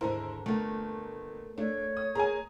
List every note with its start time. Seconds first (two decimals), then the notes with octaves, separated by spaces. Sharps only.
0.01 D#2 G#2 D3 E4 A#4 C5
0.46 G1 A3 A#3
1.58 A3 D4 C#5
1.97 D#6
2.15 A#3 G#4 G#5 A#5